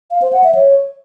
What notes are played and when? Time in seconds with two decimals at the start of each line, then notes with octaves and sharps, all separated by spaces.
0.11 F5
0.22 C5
0.33 F#5
0.44 E5
0.55 C#5